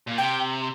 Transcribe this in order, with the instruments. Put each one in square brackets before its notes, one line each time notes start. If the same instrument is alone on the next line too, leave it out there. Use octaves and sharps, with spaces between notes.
[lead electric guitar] A#2
[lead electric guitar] C3 [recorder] G5